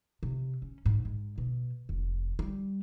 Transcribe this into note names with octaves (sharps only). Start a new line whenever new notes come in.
C3
C#4
G#2
G#2
B2
F1
G3